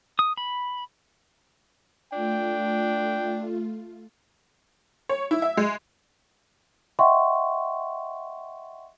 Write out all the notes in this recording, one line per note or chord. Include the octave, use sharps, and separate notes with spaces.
D#6
B5
A3 D4 F4 G5
C#5
E4
E5
G#3
D#5 E5 F#5 G5 C6 C#6